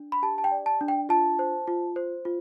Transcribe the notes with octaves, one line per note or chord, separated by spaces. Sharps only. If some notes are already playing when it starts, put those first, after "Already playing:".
Already playing: D4
B5
G4 A5
A5
G5
D5
A5
D4
G5
F4 A5
C5
F4
C5
F4